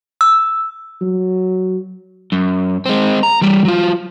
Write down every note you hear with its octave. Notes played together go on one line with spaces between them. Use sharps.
E6
F#3
F#2
G#3 C4
A#5
E3 G3
F#3 F4